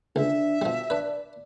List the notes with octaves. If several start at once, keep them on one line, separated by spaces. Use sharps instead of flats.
C#2 D4 E5
B2 F3 G3
D4 B4 D5